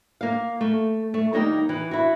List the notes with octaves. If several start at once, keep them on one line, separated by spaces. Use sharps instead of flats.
A#3 F5
A3
A3
D#2 G3 A#3 D#4 A#4 G5
E3
E4 F#4